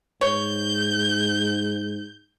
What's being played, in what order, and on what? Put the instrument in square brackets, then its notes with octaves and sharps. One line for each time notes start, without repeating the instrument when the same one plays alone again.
[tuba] G#2 [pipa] C#5 [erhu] G6